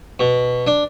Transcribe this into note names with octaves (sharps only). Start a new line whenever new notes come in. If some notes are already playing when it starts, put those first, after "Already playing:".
B2
D4